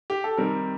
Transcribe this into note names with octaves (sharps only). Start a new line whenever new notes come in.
G4
A4
C3 D#3 G3 C4 A#4